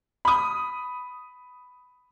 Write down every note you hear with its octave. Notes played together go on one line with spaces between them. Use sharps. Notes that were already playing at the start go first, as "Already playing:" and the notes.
B5 D#6